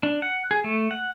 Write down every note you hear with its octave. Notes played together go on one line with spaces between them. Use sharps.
D4
F#5
G#4
A3
F#5